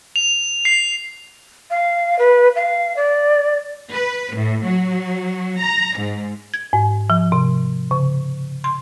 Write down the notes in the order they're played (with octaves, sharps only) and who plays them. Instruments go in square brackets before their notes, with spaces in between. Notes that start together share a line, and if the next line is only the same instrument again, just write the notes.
[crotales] F7
C7
[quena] F5
B4
F5
D5
[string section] B4
A2
F#3
A#5
G#2
[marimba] G#6
G#2
F3
C3
C#3
C6